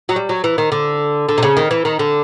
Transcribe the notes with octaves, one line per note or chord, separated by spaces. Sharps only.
F#3
G3
F#3
E3
D#3
D3
D3
C3
C#3
D#3
E3
D#3
D3